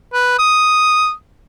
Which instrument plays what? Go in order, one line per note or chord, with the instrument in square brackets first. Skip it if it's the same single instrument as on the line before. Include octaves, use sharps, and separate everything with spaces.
[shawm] B4
D#6